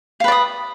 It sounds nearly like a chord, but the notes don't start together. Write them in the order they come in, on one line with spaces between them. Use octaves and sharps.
F5 B4 D5 D#6